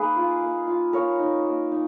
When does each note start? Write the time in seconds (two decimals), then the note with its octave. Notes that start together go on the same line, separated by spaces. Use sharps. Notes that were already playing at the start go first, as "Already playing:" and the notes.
Already playing: A#3 D#4 G#4 B4
0.16 F4
0.42 A#3
0.67 F4
0.93 A#3 A#4 C#5
1.19 D#4
1.45 A#3
1.72 D#4